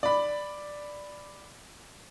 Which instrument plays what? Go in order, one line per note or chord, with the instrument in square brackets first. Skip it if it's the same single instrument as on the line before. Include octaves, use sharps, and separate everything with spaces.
[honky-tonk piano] D5 B5